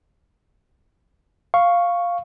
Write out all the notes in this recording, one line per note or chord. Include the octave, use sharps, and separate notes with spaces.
F5 C#6